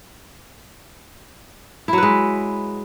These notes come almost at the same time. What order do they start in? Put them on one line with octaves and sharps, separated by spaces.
E4 F#3 B4 G#3